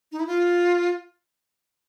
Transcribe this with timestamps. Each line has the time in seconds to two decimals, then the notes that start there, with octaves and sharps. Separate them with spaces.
0.12 D#4
0.20 E4
0.27 F4